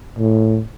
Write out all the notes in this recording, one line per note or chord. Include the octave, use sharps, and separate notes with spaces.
A2